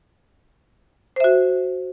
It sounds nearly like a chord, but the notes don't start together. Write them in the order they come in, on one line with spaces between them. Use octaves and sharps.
C5 E5 F#4